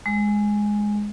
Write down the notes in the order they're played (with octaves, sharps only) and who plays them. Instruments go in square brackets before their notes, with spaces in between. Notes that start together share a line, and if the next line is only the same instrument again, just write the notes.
[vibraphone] G#3